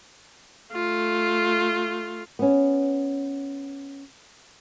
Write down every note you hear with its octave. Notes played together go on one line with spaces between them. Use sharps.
A3 F4
B3 C#4